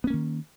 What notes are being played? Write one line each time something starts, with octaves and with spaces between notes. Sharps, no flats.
D#3 A#3 B3 C#4